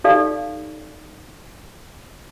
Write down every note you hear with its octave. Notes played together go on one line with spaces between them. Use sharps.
D#4 G4 A4 D5 F5